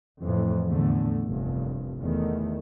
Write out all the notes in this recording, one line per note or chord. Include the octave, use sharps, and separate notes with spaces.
F2 A2 E3
E2 A2 D3 A3
F1 C2 G2
E2 D#3 A3